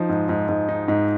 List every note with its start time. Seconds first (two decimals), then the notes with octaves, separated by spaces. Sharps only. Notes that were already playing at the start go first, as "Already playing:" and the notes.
Already playing: F3 D#4
0.09 G#2
0.29 G#2
0.48 G#2
0.69 D#4
0.88 G#2